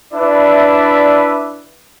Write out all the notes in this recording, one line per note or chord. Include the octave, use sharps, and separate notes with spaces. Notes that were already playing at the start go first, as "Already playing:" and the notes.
D4 E4 B4 D5 E5